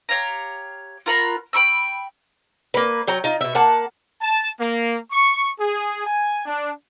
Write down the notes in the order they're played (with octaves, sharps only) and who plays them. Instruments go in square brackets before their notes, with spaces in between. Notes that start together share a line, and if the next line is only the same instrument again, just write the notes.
[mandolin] G4 C#5 F5 A#5
F4 A#4 F#5 B5
G5 B5 C#6 E6
[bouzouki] A#3 B4
F#3 C#5 G5 A#5
D#4 F4
B2 E5
A#3 F#5 A5
[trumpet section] A5
A#3
C#6
G#4
G#5
D4